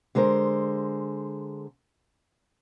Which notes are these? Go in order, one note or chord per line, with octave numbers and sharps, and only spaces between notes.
D3 G#3 A#4 C5